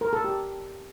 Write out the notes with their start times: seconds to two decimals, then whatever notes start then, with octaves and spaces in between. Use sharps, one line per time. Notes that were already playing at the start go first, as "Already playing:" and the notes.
0.01 A#4
0.13 A4
0.24 G4